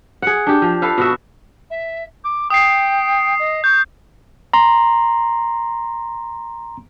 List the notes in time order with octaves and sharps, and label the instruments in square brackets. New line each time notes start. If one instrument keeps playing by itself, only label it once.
[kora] G#4 F#5
D4 G4
F3
A4 B4 F5
B2 F#4 E5
[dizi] E5
D6
[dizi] G5 [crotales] D#6 C7
[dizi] D#5
[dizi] C#6 [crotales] G6
[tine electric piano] A#5 C6